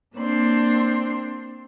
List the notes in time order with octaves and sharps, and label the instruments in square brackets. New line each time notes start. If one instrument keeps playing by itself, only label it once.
[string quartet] A#3 C4 D4 C6